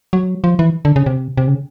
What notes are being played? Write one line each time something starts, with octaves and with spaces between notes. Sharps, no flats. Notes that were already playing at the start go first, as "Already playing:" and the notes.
F#3
F3
E3
D3
C#3
C3
C3
C#3